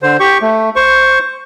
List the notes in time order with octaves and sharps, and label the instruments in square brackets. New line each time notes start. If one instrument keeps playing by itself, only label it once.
[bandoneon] D3 C5
G4 C#6
A3
C5 C#6